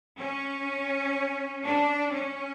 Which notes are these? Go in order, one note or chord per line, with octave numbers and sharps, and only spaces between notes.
C#4
D4
C#4